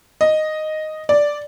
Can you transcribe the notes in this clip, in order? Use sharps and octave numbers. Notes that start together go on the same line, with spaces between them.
D#5
D5